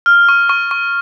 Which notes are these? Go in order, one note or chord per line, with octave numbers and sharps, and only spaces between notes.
F6
C#6
C#6
C#6